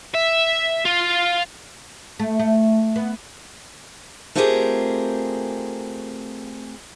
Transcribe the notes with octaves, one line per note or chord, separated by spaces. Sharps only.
E5
F4
A3
A3
B3
A3 C4 F4 G4 G#4 A#4